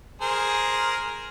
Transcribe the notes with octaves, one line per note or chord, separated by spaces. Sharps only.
G#4 A#4 C5